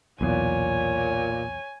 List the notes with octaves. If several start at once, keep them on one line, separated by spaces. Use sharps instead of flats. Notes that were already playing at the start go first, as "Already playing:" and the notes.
B1 E2 A#2 C#5 G#5